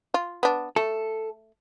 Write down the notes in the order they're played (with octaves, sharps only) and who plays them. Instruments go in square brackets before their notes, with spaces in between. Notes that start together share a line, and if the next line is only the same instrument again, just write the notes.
[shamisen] F4
B3 D4
[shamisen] A3 [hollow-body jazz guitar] A4